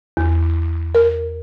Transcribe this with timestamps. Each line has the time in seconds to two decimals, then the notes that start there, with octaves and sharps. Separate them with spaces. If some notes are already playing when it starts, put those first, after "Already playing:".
0.17 E2
0.95 A#4